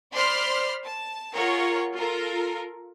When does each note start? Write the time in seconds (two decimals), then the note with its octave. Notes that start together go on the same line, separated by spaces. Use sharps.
0.14 C5 D5 B5 C6 F6
0.82 A5
1.34 F4 G#4 A#4 C#5 F#5
1.97 F4 A4 A#4